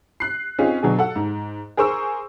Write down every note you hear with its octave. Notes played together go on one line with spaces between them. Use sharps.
F#6 C7
C4 C#4 D#4 F4 G#4
B2 F#3 D4 G#4
A4 F#5
G#2
G#4 A#4 C5 C#6 E6